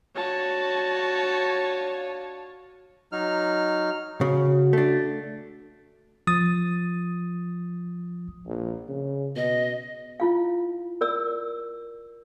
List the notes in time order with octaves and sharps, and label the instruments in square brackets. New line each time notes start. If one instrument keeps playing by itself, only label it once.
[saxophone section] D4 F4 C#5 [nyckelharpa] F#4 [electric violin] A5
[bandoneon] F#3 D#4 F6
[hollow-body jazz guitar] C#3 [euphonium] F#4
[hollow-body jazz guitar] A3 D4
[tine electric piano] F3 D#6 A6
[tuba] A#1
C#3
[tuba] B2 [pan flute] D#5
[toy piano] E4 F4 F5
A#4 D5 E6